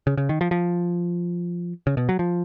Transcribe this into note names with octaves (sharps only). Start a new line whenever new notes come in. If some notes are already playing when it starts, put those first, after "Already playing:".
C#3
C#3
D#3
F3
F3
C#3
B2
F#3
F3